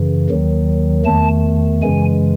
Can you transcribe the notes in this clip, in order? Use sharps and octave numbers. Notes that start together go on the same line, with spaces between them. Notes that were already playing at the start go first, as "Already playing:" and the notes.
Already playing: F#2 C#3 E3
D#2 D#3 F#3
E2 D#3 A3 A5
F#2 C#3 E3 G#3 G#5